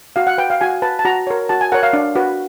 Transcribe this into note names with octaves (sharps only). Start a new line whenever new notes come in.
F#4 F5
F#5
B4 G5
F5
F#4 G#5
B4 A5
A5
F#4 A#5
A#4 C#5
F#4 A5
G#5
A#4 C#5 F#5
F5
D4
F#4 B4